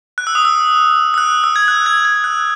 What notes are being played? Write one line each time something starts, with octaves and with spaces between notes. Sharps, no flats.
F#6
E6
D#6
E6
E6
F#6
E6
G#6
F#6
G#6
G#6
F#6